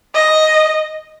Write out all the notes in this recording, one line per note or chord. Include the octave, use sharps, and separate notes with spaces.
D#5